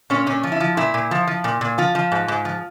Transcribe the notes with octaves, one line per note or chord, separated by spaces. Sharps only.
A#2 C#4
A#2 C#4
F3
E4
F3
A#2 E4
A#2
F3
F3
A#2
A#2
F3 F4
F3
G#2
G#2
F3